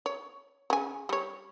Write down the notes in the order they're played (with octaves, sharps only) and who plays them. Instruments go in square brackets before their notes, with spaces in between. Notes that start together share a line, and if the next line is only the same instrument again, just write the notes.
[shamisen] C#5
C#3 G#5
G3 C#5